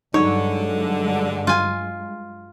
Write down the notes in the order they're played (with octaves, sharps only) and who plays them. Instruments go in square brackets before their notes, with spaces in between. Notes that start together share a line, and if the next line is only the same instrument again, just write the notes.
[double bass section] G2 F#3 G#3 [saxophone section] D3 [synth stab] D#4 [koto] C#5
[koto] F4 G#5